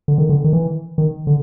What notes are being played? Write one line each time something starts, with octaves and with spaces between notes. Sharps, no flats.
D3
D#3
D3
D#3
E3
D#3
D3